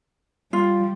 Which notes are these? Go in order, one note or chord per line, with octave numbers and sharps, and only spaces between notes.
G3 F4